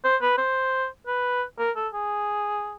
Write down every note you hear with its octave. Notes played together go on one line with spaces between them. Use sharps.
C5
B4
C5
B4
A#4
A4
G#4